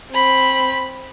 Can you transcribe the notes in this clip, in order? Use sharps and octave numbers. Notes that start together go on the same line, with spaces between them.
C4 B5